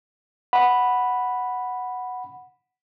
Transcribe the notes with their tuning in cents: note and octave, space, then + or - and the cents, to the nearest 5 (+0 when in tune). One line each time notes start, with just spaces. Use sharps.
F#5 +0 B5 +0